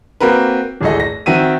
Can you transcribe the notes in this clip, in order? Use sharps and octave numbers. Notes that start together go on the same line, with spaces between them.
A#3 C4 F#4 A#4 B4
D1 G#1 G#4 A4 D#5
A#6
D#3 C4 F#4 E5 D#7